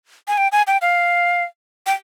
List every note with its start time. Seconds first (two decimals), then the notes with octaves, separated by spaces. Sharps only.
0.28 G#5
0.38 G5
0.52 G#5
0.67 G5
0.82 F5
1.86 G5